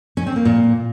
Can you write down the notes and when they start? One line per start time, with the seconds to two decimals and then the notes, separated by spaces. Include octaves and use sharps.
0.17 C#4
0.26 C4
0.36 A#3
0.45 A#2